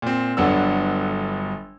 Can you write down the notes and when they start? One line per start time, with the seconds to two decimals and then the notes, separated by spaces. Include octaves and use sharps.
0.02 A#2 C4
0.37 G1 D3 F#3 B3 D4 E6